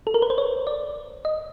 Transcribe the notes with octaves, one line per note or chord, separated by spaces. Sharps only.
A4
A#4
B4
C5
C#5
D5
D#5